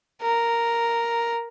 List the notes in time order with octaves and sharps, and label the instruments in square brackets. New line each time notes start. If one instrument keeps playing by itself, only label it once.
[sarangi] A#4